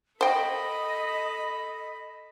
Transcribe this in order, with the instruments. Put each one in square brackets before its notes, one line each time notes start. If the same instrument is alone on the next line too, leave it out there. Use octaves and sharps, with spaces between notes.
[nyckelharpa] A4 B5 [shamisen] C5 G5 [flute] D#5